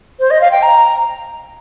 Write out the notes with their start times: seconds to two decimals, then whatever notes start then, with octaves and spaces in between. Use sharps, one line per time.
0.20 C5
0.31 D#5
0.41 F5
0.51 G5
0.63 A#5